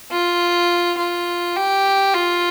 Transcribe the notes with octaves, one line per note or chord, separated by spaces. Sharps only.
F4
F4
G4
F4